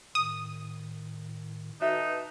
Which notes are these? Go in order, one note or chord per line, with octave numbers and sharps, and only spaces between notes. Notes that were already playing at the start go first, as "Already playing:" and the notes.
A2 D#3 D#6
D#4 F#4 A4 B4 E5 A5